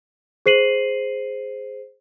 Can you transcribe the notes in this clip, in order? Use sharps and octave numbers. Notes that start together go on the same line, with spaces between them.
G#4 C5 C7 D#7 F#7